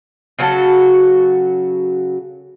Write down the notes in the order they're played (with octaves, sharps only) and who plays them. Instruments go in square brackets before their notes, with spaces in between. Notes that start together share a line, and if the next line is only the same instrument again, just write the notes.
[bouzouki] C#3 F#3 F#4 A4